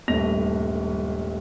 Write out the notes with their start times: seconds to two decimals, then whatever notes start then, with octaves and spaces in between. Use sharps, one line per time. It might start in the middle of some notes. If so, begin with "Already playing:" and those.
0.08 D#1 G#1 G2 A3 A#6 F7